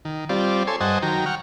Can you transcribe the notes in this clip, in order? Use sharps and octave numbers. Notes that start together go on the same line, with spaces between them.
D#3
G3 C4 F4 D5
A4 C#5 G#5 C6
G2 C5 D#5 F#5 G#5 A5
D#3 F#3 G5 A#5
F#5 G5 C#6 F6